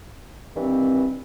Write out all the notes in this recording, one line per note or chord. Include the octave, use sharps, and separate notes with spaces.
G2 D#3 E3 C4